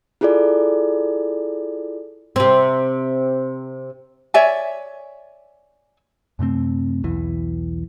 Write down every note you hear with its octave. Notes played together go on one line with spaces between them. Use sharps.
E4 F4 G#4 A4 D5
C3 C4
C#5 D5 E5 G#5
F#2 C3 A3 C4
B1 E2 E3